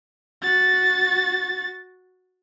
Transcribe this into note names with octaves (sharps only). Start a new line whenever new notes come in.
F#4 A6